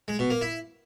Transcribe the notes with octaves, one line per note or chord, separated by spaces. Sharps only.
G#3
B2
A#3
E4